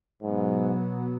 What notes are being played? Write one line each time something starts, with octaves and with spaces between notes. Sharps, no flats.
G#2 B2 F#3 B3